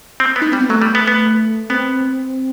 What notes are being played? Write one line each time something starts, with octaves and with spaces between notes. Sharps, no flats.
C4
B3
D#4
G3 C4
B3
F#3 A3
G3
B3
B3
B3 C4